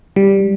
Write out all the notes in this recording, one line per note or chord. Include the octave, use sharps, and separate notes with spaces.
G3